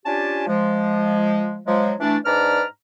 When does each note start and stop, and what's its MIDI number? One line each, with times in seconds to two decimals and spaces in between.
0.05 0.44 61
0.05 0.44 62
0.05 0.44 65
0.05 0.44 67
0.05 0.44 80
0.05 0.44 81
0.47 1.60 53
0.47 1.60 56
1.67 1.93 53
1.67 1.93 54
1.67 1.93 56
2.00 2.17 52
2.00 2.17 57
2.00 2.17 62
2.24 2.64 44
2.24 2.64 62
2.24 2.64 71
2.24 2.64 74
2.24 2.64 82
2.24 2.64 89